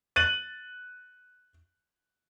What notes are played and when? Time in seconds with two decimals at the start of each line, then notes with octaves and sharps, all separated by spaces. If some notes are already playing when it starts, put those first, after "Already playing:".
0.16 F#6 A6 D#7 F#7